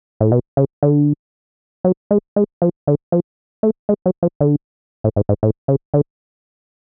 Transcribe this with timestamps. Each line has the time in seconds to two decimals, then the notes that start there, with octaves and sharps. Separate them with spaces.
0.20 A2
0.32 B2
0.57 C#3
0.83 D3
1.84 F#3
2.11 G#3
2.36 G#3
2.62 F3
2.87 D3
3.12 F3
3.63 A3
3.89 G#3
4.06 F#3
4.23 F3
4.41 D3
5.04 A2
5.16 G#2
5.29 G#2
5.43 A2
5.68 C#3
5.94 D3